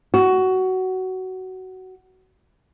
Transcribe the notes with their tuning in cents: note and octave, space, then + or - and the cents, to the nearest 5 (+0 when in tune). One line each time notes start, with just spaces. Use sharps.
F#4 +15